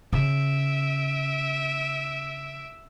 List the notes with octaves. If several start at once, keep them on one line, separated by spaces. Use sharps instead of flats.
C#3 E5 D7